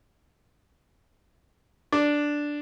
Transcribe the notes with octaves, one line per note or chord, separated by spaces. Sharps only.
D4